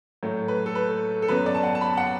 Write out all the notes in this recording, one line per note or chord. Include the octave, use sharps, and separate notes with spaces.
A2 F#3 A3
B4
A4
B4
A4
F#2 F#3 B3 B4
D5
A5
F#5
A5
B5
F#5